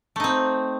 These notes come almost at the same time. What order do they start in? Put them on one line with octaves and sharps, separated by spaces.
A3 D#4 C4